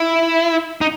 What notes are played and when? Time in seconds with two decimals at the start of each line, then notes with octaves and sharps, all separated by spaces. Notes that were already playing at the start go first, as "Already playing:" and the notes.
Already playing: E4
0.81 D#4